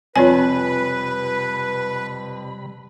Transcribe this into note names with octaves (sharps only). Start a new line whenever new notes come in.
F2 C3 G3 F4 B4 C#5 G#5 B5